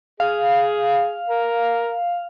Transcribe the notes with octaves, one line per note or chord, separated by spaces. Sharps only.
G#4 F5
A#4